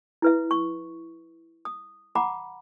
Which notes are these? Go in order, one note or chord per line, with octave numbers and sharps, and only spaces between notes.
E4 B4 E5
C#6
D#6
F#5 A#5 B5 D6